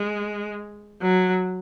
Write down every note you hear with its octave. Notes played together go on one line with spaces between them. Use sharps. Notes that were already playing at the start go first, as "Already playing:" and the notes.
Already playing: G#3
F#3